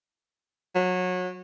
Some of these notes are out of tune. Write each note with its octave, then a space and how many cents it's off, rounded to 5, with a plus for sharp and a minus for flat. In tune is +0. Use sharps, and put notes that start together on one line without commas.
F#3 -25